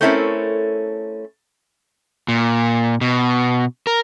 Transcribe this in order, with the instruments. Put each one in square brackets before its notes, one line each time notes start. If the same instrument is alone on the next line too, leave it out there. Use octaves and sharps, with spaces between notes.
[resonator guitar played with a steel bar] A3 C4 C#4 E4 A4 A#4
[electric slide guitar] A#2
B2
A#4